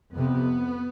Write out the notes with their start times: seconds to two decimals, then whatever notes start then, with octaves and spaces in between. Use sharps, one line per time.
0.15 F2 C3 B3